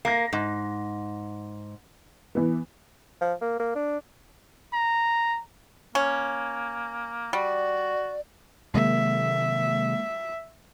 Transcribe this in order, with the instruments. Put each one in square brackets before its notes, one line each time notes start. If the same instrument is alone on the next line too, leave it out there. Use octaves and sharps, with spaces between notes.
[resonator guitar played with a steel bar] A#3 [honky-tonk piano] A#6 C7
[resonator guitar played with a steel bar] G#2
[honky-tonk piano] E3 B3
[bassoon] F3
A#3
A#3
D4
[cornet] A#5
[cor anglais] A#3 [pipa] C#4
[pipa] G3 [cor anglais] F#4 [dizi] D5
[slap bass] C3 D#3 F#3 [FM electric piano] G#3 A#3 [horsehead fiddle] E5